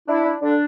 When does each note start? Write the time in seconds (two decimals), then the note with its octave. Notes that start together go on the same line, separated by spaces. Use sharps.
0.08 D4 E4
0.25 D4
0.42 D3 D4